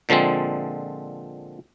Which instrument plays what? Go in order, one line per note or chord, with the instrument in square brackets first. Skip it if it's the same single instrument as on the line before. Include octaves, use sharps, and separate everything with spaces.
[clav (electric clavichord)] A#2 D3 F3 G#3 C4